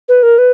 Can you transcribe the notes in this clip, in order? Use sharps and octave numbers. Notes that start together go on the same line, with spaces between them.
B4
A#4
B4